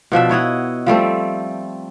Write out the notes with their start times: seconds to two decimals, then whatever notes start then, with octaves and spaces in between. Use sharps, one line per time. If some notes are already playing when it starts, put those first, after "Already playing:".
0.12 B2 F3 D4 E5
0.29 E4 C#5 D#5 F#5
0.86 F3 G3 A3 C4